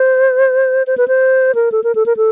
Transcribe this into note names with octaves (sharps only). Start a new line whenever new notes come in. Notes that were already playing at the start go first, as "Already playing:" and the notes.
Already playing: C5
C5
B4
C5
A#4
A4
A#4
A4
A#4
A4